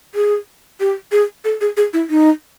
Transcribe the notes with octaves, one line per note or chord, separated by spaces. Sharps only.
G#4
G4
G#4
A4
G#4
G#4
E4
D#4